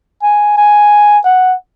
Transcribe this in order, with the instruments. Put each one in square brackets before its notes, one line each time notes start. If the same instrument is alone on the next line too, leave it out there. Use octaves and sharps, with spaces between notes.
[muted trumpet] G#5
G#5
F#5